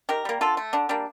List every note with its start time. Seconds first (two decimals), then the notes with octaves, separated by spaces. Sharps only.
0.09 D#3 G4 A#4
0.25 G3 A#3
0.41 D3 F4 A4
0.57 A3
0.73 D3 D4
0.89 G3 A#3 D4